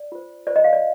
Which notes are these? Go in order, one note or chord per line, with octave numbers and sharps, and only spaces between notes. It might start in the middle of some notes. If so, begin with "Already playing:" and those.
Already playing: D5
F4 C5
F4 C5 D5
D#5
F5
D5